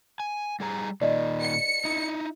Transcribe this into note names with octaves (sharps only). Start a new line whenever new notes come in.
G#5
G3 G#4 A#5
A#2 D#3 D5 D#5
C#7
D#4 E4